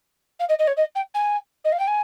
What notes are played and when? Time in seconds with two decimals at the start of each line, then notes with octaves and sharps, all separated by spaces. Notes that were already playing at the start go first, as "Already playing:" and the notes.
0.39 F5
0.48 D#5
0.58 D#5
0.67 C#5
0.76 D#5
0.95 G5
1.14 G#5
1.64 D#5
1.72 F5
1.79 G5
1.87 G#5